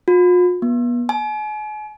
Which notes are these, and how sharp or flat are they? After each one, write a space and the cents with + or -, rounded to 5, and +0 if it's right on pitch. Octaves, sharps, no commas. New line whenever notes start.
F4 +45
B3 -35
G#5 +40